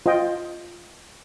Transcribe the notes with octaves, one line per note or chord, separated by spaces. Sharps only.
F4 C5 D#5 G5